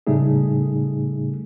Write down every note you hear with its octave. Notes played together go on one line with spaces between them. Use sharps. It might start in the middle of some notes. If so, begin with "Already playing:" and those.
A2 C#3 G3 A3 D#4 G#4